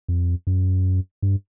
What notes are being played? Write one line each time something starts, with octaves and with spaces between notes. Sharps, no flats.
F2
F#2
G2